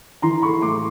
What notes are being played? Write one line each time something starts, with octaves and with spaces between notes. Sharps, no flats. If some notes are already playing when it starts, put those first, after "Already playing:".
E3 A#5 C6
B5 C#6
A2 C6 D6